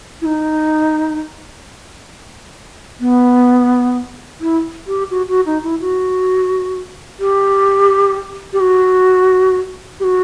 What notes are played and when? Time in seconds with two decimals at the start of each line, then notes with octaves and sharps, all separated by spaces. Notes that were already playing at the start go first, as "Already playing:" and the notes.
0.22 E4
0.25 D#4
3.00 B3
4.41 E4
4.87 G4
5.11 F#4
5.29 F#4
5.46 D#4
5.63 E4
5.81 F#4
7.20 G4
8.53 G4
8.60 F#4
10.00 G4
10.04 F#4